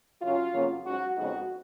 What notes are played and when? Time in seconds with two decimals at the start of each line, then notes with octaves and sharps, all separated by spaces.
0.22 F#2 C#3 F#3 C#4 F4
0.54 F2 C#3 F#3 A#3 C#4
0.85 G#2 F#3 C#4 F#4
1.17 F2 C#3 G#3 B3 D#4 F#4